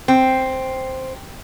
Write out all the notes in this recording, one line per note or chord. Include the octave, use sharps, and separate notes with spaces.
C4